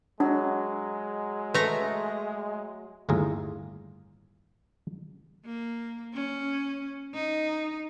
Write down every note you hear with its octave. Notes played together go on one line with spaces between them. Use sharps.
F#3 G#3 D4
A3 B4 A#5
G1 D#2 A2 F4 G#4 A#5
A#3
C#4
D#4